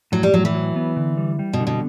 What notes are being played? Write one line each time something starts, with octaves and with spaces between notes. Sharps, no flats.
A2 F#3
G3
A2 F#3
E3
F#3
B3
D3
G3
G3
B2
D3
B2